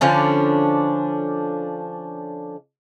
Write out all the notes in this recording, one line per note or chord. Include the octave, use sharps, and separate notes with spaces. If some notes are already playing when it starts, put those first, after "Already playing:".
D3 F3 C#4 D4